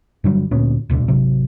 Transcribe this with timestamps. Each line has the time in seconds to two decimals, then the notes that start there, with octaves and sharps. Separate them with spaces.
0.24 G2 D3 F#3 G3
0.51 D2 A#2 B3 C#4
0.90 D#1 D2 B2 D3
1.08 G#1 C3 F#3